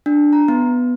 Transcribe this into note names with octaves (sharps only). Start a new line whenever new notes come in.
D4
A#5
B3